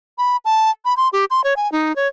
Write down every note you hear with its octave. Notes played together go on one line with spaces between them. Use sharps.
B5
A5
B5
C6
G4
C6
C#5
G#5
D#4
C#5